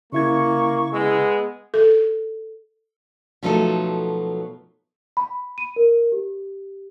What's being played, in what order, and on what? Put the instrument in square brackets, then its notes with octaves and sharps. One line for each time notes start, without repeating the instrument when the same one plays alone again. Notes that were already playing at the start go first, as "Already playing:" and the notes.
[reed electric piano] C#3 E4 G#6 [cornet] A#3 [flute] C#6
[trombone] G#3 [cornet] B3 [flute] E6
[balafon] A4
[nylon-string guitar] B2 F3 F#3 A3 D#4 A4
[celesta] B5
D#7
A#4
G4